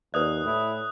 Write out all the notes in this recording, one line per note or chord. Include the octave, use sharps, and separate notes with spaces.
D#2 B4 D5 D#6 F#6
A2 E4